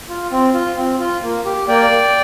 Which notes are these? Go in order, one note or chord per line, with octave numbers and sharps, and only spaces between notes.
F4
C4
F4
C4
F4
A#3
G4
A#3 D5 G5